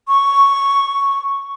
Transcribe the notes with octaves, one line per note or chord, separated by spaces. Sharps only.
C#6